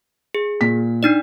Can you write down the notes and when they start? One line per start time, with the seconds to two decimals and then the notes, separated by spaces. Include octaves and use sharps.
0.35 G#4
0.61 A#2 B6
1.03 D4 D#4 D5